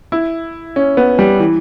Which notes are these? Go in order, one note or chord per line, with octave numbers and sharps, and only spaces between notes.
E4
C#4
B3
G3
E3